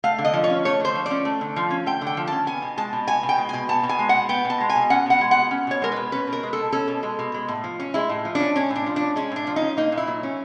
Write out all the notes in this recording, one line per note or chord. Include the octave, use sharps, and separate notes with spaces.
A3 F5
D3
D#5
F3
C#5
C#4
A3 C#5
D3 C5
F3
D5
C#4
A3
D3
F3
C#4
A3 G5
D3
G5
F3
C#4 A5
B3 G#5
B2
G#3 A5
B2
B3 G#5
B2
G5
G#3
B2 G#5
B3 A5
B2
G#5
G#3
F#5
B2
B3 G5
B2
A5
G#3
G#5
B2
C#4 F#5
B2 F#5
G#3
F#5
B2
C#4
B2 C#5
G#3 A#4
B2 B4
C#4 B4
B2
A#4
G#3
B2 A4
C#4 A4
B2
G#3
B2
G#3
A2
F3
C#4
G#3 E4
A2
F3
C#4 D4
G#3 C#4
A2
D4
F3
C#4 D4
G#3 C#4
A2 D4
F3
D#4
C#4
A#3 D#4
A#2
E4
F#3
C#4